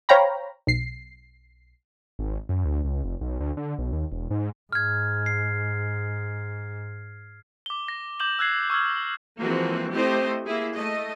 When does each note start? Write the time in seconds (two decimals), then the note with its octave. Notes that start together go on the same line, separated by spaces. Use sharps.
0.09 C5 C#5 F5 G5 A#5 B5
0.67 B1 C7
2.19 G#1
2.49 F#2
2.65 D2
2.85 C#2
3.04 F1
3.21 B1
3.40 D2
3.57 D3
3.79 B1
3.92 D#2
4.12 E1
4.31 G#2
4.73 G#2 F6 G#6
5.26 C7
7.66 D6 G7
7.88 A#6
8.19 D6 G6 E7 F#7 G7
8.39 E6 F#6 G#6 C7
8.70 C#6 E6 F6 G#6
9.39 E3 F3 G#3 A#3 C4 F#4
9.93 A3 C4 E4 G4 C5 D#5
10.46 A#3 E4 G#4
10.74 A3 D#5